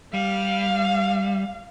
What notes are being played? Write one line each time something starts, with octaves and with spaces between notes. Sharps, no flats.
G3 F5